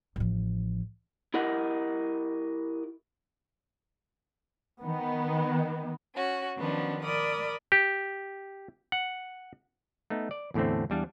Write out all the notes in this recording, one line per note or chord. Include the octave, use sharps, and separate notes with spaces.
A1 F3
E4 G4 A#4 D#5 F#5
D#3 B3
C#4 F#4
D#3 F3 F#3 B3 C#4 D4
A#4 D5 B5 D#6
G4
F#5
A3 B3 D#4
D5
E2 A2 D3 A3 C4
E2 G3 D4 F5